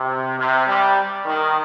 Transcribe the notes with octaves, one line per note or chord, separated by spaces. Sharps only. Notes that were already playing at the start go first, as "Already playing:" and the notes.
Already playing: C3
C3
G3
D#3